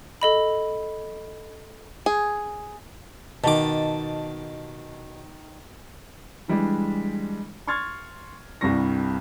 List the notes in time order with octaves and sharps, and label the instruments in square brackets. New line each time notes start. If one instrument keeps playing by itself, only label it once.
[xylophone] A4 D#5 B5
[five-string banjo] G#4
[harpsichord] B2 D6 [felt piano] D#3 A5
[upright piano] E3 G3 G#3 D4
C6 C#6 F6 G#6 A6
C2 G2 C3 G3 C#6 A#6